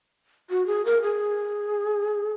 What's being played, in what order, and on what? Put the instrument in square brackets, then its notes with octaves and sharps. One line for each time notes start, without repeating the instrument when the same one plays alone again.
[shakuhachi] F#4
G#4
A#4
G#4